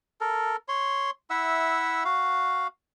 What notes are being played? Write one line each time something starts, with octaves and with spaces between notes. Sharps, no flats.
A4 A#4
C#5 C6
E4 E5 F#5 E6
F#4 F5